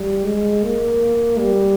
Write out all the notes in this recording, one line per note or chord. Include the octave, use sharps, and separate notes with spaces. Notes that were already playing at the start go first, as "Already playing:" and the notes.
Already playing: G3
G#3
A#3
G3